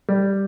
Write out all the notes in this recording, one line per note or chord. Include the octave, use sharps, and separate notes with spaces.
G3